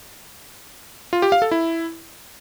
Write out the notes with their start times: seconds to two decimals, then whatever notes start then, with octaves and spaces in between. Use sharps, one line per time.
1.13 F4
1.22 G4
1.32 F5
1.42 A4
1.51 E4